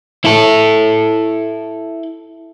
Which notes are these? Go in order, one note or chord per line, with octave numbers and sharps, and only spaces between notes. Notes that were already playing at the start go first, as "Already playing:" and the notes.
E4 A4